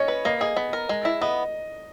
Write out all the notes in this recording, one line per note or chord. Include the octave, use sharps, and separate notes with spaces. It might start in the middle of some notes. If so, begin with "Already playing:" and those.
Already playing: C#4 C#5 D#5
B4
A#3 D#5
G#4 D#5
B3
A#4
G#3
E4
B3 D#5